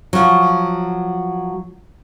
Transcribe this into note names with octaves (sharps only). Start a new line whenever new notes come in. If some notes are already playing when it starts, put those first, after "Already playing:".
F3 F#3